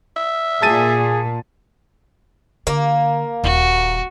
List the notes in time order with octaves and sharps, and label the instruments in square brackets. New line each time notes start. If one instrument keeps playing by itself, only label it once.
[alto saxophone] E5
[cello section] A#2 [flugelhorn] G#4 [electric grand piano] A5 A6 D#7
[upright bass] D3 [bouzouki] A#3
[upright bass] D#1 [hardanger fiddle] F#4